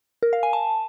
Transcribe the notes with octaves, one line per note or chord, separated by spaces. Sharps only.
A#4
F5
G#5
A5